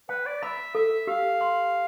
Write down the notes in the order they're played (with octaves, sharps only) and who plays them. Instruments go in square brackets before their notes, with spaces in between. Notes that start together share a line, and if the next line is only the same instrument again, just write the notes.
[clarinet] B4 [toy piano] G5
[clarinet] D5
[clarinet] E5 [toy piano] B5
[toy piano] A4 [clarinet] E5
[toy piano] G4 [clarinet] F5
[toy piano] C6